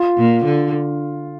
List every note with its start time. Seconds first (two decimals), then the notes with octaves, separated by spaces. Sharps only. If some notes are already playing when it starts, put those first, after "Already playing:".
Already playing: F4
0.17 A#2
0.45 D3